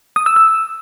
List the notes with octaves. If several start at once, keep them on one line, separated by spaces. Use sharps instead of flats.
D#6
E6
E6